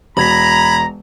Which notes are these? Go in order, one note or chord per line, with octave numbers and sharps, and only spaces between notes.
E1 A#5 B5 G#6 B6